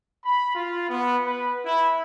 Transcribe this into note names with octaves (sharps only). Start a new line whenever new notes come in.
B5
F4
B3
B4
E4